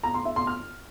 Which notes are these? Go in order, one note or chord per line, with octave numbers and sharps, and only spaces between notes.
A#5
C6
E5
C6
F6